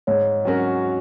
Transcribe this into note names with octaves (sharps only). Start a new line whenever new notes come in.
G#2 C#5
F#3 C#4 F#4 A#4